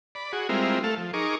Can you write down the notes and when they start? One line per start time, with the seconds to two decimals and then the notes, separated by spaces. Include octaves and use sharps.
0.15 D5 B5
0.33 F#4 G#4
0.49 G3 G#3 C4 E4 F4 A#4
0.84 A3 A4 F5
0.98 F3
1.13 D#4 G#4 A#4 C#6 D6